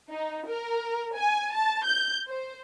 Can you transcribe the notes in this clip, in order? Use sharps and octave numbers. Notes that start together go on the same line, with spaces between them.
D#4
A#4
G#5
A5
G6
C5